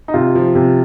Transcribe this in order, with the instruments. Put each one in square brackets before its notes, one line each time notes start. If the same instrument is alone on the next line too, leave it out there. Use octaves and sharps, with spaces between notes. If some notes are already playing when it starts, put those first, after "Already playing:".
[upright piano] D#4
C3 F4
F3
C3